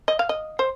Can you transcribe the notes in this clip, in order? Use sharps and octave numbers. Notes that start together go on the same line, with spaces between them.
D#5
F5
D#5
C5